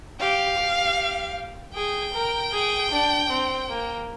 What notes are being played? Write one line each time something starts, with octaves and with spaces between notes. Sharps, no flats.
G4 F5
G4
G#4 G5
A#4
G#4
D4
C4
A#3